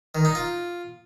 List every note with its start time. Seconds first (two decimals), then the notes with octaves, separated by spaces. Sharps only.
0.15 D#3
0.25 D#4
0.35 F4